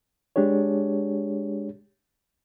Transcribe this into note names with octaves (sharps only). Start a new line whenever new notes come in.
G#3 D4 G4 G#4 C#5